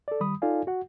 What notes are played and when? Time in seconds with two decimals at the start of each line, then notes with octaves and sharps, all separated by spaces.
0.08 A4 D5
0.20 D#3 G3 B5 D#6
0.42 D#4 F4 A4 D5 F5 G#5
0.67 F#4 F#5